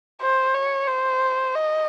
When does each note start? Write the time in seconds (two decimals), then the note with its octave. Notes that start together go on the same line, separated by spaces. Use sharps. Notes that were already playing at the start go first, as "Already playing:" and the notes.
0.21 C5
0.54 C#5
0.88 C5
1.55 D#5